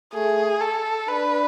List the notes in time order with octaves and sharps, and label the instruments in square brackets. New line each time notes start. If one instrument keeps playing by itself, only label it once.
[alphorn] A3 [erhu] G#4
[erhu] A4
[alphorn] D4 [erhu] B4